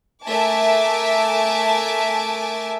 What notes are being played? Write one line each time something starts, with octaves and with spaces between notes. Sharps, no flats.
A3 A#4 E5 G#5 A5 D6